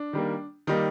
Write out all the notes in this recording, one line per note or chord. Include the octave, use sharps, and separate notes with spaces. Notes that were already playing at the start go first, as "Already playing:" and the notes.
Already playing: D4
D#3 G3 A#3
D#3 G3 A#3 D#4